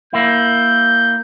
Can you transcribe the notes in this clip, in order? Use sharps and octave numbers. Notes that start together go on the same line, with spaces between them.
A#3 E4 G6